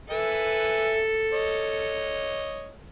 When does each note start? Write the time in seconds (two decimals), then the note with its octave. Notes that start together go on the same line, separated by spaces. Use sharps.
0.10 A4 B4 E5 G#5
1.33 C#5 D#5